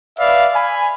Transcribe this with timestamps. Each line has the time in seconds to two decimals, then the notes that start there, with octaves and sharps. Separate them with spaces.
0.18 B4 D5 E5 F5
0.52 G#5 B5